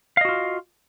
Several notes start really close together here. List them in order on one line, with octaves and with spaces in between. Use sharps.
F5 D#5 F#4 F4